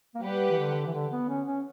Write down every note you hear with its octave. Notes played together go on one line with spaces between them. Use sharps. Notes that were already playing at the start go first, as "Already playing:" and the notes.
A#3
G3 G4 B4 F#5
E3
D3
E3
D3
B3
C#4
C#4